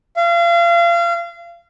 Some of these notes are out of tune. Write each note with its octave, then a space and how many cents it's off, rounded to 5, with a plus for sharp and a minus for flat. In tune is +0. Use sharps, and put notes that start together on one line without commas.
F5 -35